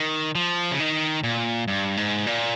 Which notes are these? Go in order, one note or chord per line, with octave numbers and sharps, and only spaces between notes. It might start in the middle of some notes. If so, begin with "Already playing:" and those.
Already playing: D#3
F3
C#3
D#3
A#2
G2
G#2
A#2